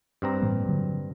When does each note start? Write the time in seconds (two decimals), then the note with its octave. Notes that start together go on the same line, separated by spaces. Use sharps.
0.22 G2 C4 A#5
0.42 A2 E3 A#3
0.66 D3 F#3